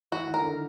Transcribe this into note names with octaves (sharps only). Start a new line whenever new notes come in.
E3 E4 F#4
D#3 D#4
A#4
D3 D4